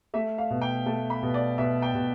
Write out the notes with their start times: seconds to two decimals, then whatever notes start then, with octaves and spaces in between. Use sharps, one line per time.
0.14 A3 E5
0.38 F5
0.50 B2
0.62 G5
0.86 A3 A5
1.10 B5
1.23 B2
1.34 D5
1.58 B2 E5
1.82 G5
1.94 B2